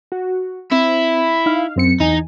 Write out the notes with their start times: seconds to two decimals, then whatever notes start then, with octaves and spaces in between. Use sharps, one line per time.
0.12 F#4
0.72 C4 E4
1.46 D#4 F5
1.76 F#2 C4 C#7
2.00 E2 D#4 G#5